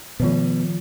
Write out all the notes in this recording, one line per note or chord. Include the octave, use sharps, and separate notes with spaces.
B2 D#3 F3 F4